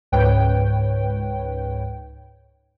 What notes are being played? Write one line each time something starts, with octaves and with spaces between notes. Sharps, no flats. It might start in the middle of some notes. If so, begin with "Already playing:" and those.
C#2 G#2 B4 C#5 G5